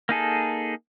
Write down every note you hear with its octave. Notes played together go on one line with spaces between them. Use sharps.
A#3 D#4 G#4 A4